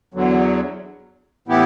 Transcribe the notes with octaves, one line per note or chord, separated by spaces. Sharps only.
E2 D3 F#3
A2 E3 B3 E4 G4